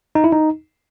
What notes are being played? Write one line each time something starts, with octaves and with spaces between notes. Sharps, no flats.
D#4
E4
D#4